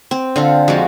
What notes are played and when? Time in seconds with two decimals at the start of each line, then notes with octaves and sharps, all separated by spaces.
0.11 C4
0.36 D3 C4 F4 A4
0.68 F2 F3 G#3 F#4